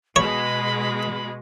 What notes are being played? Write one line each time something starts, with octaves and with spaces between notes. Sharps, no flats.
B2 G#3 C#5 B5